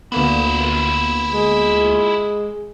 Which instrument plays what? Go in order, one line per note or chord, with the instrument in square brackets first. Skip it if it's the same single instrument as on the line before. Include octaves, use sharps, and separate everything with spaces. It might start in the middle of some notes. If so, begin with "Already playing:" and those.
[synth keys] D2 A#3 B3 [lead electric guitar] E4 F4
[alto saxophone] G#3